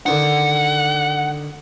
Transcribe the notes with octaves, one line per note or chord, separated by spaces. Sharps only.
D3 D#3 D4 F#5